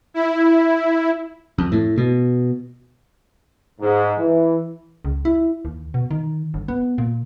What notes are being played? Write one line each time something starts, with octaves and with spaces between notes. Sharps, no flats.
E4
F2
A2
B2
G#2
E3
C#2
E4
D#2
B2
D#3
G1
B3
A#2